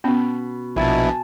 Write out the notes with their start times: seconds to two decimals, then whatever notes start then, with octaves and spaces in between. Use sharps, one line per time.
0.04 B2 B3 C#4 B5
0.76 A#1 B2 E4 G#5 A5